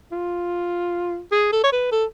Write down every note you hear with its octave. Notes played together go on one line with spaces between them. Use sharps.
F4
G#4
A4
C#5
B4
A4